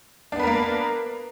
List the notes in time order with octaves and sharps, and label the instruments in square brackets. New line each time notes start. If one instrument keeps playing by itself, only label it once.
[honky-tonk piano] D4
B3
B4
A#4
A#3